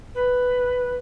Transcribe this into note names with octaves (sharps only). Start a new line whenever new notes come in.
B4